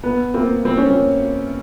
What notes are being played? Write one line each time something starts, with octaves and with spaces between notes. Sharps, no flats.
B3
A#3 C4
C4
C#4
A#3 C4